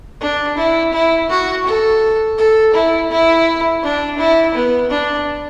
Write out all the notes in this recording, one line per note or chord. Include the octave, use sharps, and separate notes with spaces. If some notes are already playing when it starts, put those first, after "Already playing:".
D4
E4
E4
F#4
A4
A4
E4
E4
D4
E4
B3
D4